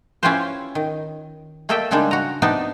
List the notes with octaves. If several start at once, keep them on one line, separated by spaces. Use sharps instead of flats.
C#4 E4 F4 G4 B4 C5
D#3
A3 A#3 A4 D#5 E5 G5
C#3 G3 G#3 A#3 D4 D#4
F#4 A#5
C3 B3 D4 D#4 A5